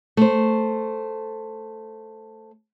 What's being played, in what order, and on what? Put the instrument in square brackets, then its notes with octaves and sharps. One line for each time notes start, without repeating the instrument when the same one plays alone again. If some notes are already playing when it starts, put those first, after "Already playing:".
[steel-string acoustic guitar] A3 C5